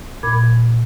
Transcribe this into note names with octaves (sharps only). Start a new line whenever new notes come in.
A#2 B5 D6 G#6